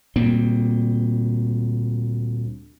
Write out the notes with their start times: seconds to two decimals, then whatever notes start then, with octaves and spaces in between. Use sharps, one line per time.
0.16 D2 A#2 G3 C4